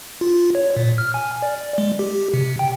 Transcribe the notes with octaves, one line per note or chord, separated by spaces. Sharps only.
F4
C#5
A#2
F6
G#5
D5
G#3
G4
C3
G5